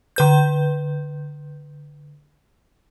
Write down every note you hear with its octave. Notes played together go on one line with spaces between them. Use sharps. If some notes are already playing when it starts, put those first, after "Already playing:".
D3 B4 G6